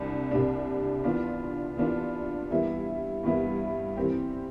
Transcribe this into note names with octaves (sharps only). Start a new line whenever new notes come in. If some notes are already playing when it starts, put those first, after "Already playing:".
Already playing: C2 C3 G3 D4
C2 C3 G3 D4
E3 B3 D4 F4
E3 B3 D4 F4
G2 E3 G3 B3 E4
G2 E3 G3 B3 E4
E3 G3 C4 G4